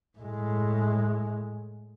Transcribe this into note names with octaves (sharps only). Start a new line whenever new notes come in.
A2 G#3